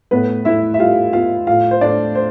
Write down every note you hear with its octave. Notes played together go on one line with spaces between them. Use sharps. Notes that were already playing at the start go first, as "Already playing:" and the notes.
A2 B3 B4
A2 E4 E5
E5
G3 F4 F5
B3 F4 F5
A2 F4 F5
C5
A2 D4 D5
C5